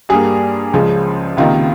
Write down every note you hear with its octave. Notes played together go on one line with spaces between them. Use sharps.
G2 G3 A#3 G#4
C#2 C#3 F3 G#3
C#2 C3 D#3 A#3 F4